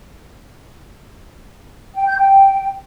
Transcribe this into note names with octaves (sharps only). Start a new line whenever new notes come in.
G5
G6
G5